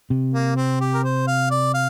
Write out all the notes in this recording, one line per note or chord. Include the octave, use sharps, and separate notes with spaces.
C3
A#3
C4
G4
A#4
C5
F5
D5
F5